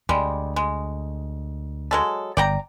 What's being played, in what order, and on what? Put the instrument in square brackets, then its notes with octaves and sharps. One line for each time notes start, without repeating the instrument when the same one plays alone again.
[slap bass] D2 [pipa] G3 G#3
[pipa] G#3
F#3 G#3 A4
[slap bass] G1 [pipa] D5 G5 A#5